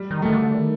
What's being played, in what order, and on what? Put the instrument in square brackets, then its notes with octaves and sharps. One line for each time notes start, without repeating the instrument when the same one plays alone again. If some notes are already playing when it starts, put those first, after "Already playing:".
Already playing: [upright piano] G3
[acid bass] D#3
[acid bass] D#3 [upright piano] A3
[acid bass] D3
D#3